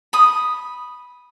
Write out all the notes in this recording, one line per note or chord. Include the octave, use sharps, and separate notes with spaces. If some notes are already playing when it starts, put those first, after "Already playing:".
B5 D#6